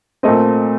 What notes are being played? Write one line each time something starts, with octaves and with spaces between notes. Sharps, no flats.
A#2 A3 C4 D#5